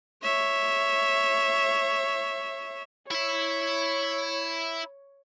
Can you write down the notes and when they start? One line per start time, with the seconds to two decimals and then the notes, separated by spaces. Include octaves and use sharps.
0.23 C#5 E5
3.11 E4 C#5 E5